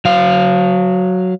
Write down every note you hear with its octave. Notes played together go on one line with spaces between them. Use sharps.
F#3 F5